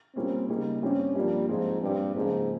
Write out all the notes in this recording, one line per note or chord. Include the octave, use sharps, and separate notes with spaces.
A#2 G3 A#3 C4 C#4
C#3 G3 A#3 D#4
G2 G3 C4 C#4 G4
G2 F3 G3 A#3
G#2 F3 C4 F4 G#4
G2 A#2 G3 C4 G4
G#2 C#3 F3 A#3 F4 G#4